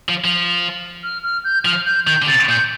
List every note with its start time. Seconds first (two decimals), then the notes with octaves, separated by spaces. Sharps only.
0.09 F3
0.24 F3
1.03 F6
1.23 F6
1.44 G6
1.65 F3 F6
1.85 G6
2.07 D#3 G6
2.22 D3
2.27 C3 A6
2.49 A#2 G6